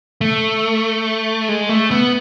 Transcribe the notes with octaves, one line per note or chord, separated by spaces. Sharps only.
A3
G#3
A3
B3